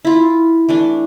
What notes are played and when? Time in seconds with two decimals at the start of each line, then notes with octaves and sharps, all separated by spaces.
0.05 E4 F4
0.69 E3 A3 D4